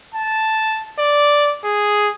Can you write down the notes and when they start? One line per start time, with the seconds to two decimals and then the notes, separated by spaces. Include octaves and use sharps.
0.14 A5
0.99 D5
1.64 G#4